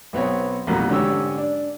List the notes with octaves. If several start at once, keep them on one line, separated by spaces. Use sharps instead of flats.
B1 B3 C4 C#5
A1 F2 B2 G3 A#3 F#5
G#2 D3 C#4 G4 C#5 E6
D4